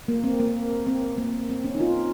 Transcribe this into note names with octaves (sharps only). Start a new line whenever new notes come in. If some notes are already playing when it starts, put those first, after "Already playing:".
A#3
C4
A#3
C4
C4
A#3
C4
C#4
D#4
F4